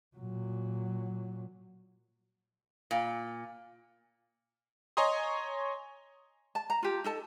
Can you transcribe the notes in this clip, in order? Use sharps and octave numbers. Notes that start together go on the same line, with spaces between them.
A#2 F#3
A#2
C#5 D#5 G#5 A#5 C6 D#6
A5
A#5
F4 G4
D#4 A4 A5